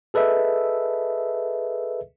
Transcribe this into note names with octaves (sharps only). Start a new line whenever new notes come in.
G#4 A4 B4 D#5 E5